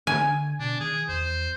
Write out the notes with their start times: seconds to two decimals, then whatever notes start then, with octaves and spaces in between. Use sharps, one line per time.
0.07 D3 G#5
0.60 B2 D4
0.80 D#3 G#4
1.09 E2 C5